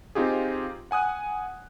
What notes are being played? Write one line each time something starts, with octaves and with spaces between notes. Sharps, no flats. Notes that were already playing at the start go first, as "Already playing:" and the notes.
C4 D#4 F4 G4 G#4
F#5 G#5 D#6 F#6